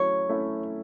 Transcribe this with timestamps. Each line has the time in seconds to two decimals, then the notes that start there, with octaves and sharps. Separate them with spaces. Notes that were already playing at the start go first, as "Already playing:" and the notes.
Already playing: F#3 A3 C#4 E4 C#5
0.29 A3 C#4 E4